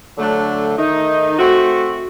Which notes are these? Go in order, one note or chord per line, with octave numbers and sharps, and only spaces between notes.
D3 F#3 A3 D4
D#3 A3 D#4
A3 C4 F#4